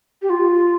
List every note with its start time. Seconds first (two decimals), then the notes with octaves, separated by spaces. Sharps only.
0.22 G4
0.30 F4